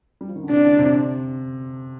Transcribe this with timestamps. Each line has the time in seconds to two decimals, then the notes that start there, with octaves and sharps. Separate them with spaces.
0.21 G3
0.28 F3
0.36 D#3
0.43 D3
0.50 C3 D4
0.65 D3
0.79 C3